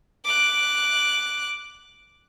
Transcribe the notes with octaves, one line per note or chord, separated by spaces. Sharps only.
D6 F#6